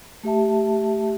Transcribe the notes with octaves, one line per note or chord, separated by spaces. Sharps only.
A3 G4 E5 A5